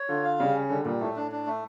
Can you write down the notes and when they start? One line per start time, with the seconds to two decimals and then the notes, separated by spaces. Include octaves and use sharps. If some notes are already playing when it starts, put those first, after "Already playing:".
Already playing: C#5
0.09 D3 F4
0.24 F5
0.39 C#3 G3
0.54 C#4
0.70 D3 G3
0.85 A#2 G3
1.00 A2 A3
1.16 D4
1.31 D4
1.46 A3